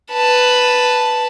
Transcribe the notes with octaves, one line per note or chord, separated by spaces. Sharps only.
B4 A5